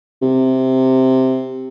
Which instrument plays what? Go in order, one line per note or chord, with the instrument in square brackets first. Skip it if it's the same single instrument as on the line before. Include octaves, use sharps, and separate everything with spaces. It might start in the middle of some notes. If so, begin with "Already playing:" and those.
[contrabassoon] C3